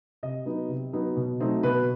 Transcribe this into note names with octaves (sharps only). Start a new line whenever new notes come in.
C3 D#5
F#3 B3 D#4
C3
F#3 B3 D#4
B2
F#3 A3 C4 D#4
B2 B4